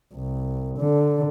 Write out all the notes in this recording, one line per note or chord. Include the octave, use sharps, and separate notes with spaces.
C2
D3